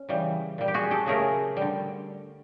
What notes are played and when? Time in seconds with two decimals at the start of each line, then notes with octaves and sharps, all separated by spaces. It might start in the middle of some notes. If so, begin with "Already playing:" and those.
Already playing: C#4
0.09 C#3 E3 G3
0.58 A#2 G3
0.68 G4
0.74 F#4 G#4
0.91 G4 A4
1.06 C#3 F#3 A3 G#4 A#4
1.57 D3 G3